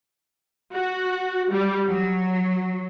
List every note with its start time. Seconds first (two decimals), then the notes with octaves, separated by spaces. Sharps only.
0.73 F#4
1.51 G3
1.88 F#3